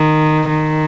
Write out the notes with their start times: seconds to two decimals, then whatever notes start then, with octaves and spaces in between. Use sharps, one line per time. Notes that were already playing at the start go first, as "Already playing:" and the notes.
Already playing: D#3
0.49 D#3